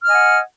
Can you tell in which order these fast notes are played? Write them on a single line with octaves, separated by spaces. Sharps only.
F6 D#5 G#5 F#5